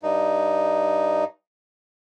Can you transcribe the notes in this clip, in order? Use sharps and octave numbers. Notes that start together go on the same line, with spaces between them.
G2 D#4